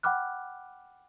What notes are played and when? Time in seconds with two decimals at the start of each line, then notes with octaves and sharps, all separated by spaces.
0.03 F#5 G5 B5 D6 F6 F#6